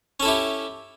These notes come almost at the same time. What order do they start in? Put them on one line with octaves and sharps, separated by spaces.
C#4 A4 E4 G4